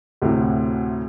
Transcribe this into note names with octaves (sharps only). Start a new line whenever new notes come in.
D2 A2 C3